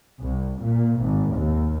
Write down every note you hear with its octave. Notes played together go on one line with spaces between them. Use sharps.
C2
A#2
G#1
D#2